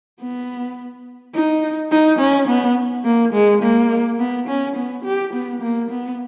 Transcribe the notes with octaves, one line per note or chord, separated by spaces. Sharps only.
B3
D#4
D#4
C#4
B3
A#3
G#3
A#3
B3
C#4
B3
G4
B3
A#3
B3